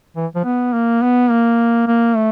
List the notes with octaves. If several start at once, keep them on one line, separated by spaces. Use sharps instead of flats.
E3
F3
B3
A#3
B3
A#3
A#3
A3